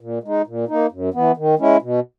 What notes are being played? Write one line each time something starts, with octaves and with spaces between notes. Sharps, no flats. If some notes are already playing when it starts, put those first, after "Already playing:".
A#2
G#3 D#4
A#2
A#3 D#4
F#2
E3 B3
D#3
G#3 C#4 E4
B2